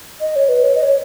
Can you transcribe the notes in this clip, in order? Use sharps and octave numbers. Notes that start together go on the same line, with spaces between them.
D#5
C#5
B4
C#5
D#5
C#5